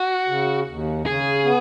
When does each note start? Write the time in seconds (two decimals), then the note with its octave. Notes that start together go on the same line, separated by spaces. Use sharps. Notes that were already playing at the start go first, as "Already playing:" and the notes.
Already playing: F#4
0.28 C#3
0.68 D#2
1.06 C#3 G#4
1.45 B3